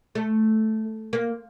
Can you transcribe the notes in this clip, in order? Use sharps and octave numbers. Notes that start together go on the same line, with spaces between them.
A3
A#3